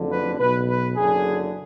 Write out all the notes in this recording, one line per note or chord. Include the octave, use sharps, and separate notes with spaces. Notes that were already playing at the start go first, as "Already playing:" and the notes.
Already playing: F#1 F2 D3
B4
B1 B2 B4
B4
F#1 F#2 D3 G#4